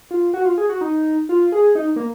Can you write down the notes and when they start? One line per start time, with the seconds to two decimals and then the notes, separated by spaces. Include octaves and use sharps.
0.11 F4
0.34 F#4
0.45 F4
0.58 G#4
0.69 F#4
0.81 D#4
1.29 F4
1.52 G#4
1.75 D#4
1.96 A#3